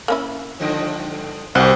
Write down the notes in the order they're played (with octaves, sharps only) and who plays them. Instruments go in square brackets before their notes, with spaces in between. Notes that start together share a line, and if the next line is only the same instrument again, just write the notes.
[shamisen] A#3 C#4 E4
[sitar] G2 D3 F3
[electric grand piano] C2 [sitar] C3 F#4 G4 [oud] C5 [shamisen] F#5